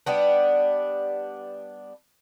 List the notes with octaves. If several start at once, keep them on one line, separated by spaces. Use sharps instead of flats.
G3 B3 D4